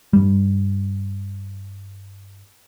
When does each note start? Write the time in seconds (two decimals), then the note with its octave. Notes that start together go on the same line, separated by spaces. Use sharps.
0.13 G2 G3